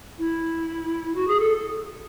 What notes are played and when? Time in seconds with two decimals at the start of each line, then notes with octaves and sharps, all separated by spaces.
0.18 E4
1.15 F#4
1.27 G#4
1.39 A4